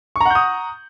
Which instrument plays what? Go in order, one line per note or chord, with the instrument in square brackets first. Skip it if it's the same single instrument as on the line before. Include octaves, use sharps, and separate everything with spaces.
[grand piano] C#6
A#5
F#5
G6
D#6